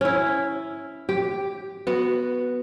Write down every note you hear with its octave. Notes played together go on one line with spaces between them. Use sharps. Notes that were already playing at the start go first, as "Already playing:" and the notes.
C#4 E4
G4
B3 F#4